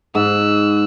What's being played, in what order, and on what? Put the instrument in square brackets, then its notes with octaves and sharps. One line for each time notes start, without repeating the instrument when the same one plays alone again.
[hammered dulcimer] G#2 [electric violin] E6 F#6